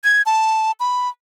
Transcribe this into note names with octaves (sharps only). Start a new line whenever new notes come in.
G#6
A5
B5